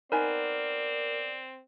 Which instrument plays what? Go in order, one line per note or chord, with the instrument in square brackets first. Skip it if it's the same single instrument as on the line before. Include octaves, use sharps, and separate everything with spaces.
[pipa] B3 D#4 G#5 [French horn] C4 [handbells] A#4 [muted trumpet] D5